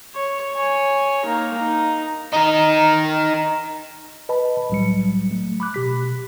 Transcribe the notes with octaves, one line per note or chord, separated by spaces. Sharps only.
C#5
C#5 G#5
A#3 D#4
D#4
D#4 A#4
B4 D#5 A5 B5
C2 A2 F#3 G3 C#7
F#3 A3
B5 D6 F#6
B2 G4 B6